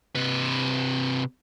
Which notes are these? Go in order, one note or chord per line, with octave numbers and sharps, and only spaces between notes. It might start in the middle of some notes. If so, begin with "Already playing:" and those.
C3 B4